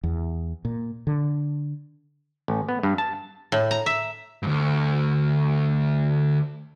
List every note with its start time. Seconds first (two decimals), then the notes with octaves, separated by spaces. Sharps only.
0.04 E2
0.65 A#2
1.07 D3
2.48 A1
2.69 B3
2.83 G2
2.98 A5
3.52 A2
3.71 A#5
3.86 E5
4.43 D2 G2